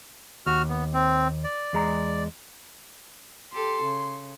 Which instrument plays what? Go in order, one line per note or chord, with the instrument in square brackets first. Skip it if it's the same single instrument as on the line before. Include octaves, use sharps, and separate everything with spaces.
[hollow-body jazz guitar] D#2 [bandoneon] F#4 F6
[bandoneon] B3
C4
D5
[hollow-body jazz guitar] E2 G#3 A#5
[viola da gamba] G4 A4 [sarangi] C6
[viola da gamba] C#3